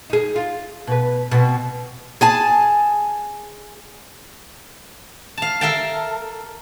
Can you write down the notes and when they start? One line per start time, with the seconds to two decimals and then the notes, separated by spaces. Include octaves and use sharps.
0.10 D#4 G#4
0.36 F4
0.87 B2 B4
1.31 B2 C4
2.21 G#4 G#5 A5
5.38 F5 A5
5.61 A4 A#4 E5 F5 G5 A5